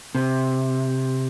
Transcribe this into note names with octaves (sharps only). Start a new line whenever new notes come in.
C3